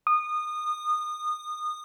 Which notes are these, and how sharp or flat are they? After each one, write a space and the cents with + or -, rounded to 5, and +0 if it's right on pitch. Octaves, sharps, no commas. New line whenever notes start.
D#6 -25